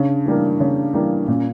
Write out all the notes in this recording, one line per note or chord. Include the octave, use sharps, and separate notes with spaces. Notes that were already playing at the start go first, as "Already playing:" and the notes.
Already playing: C#3 D4
E3 G3 A#3
C#3
E3 G3 A#3
A#2 C#4